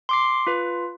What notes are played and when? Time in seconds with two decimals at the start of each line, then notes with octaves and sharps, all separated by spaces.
0.09 C6 D6 C7
0.47 F4 B4